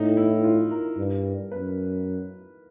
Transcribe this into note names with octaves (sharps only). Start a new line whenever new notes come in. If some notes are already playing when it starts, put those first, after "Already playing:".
Already playing: A2 D#4
E4
F4
A#4
G2
F#2 B4